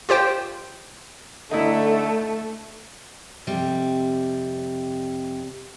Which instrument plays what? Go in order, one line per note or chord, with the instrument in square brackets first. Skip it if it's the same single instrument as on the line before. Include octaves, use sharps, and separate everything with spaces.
[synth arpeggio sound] F4 G4 C5 G5
[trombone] D3 [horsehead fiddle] A3 [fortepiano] D#4 E4
[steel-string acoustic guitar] F2 C3 G3